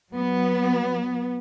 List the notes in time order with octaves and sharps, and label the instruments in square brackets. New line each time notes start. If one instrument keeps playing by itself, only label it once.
[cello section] F#3 B3